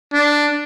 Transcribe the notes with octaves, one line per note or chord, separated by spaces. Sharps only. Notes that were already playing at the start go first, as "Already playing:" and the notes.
D4